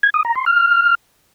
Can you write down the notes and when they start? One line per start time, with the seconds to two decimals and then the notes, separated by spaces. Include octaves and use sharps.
0.03 G#6
0.14 D#6
0.25 A#5
0.36 C6
0.46 F6